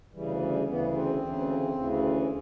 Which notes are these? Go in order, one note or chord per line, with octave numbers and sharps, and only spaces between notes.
D2 C#3 E3 G3
G3
D2 C#3 E3 B3
C4
D2 C#3 E3
D2 C#3 E3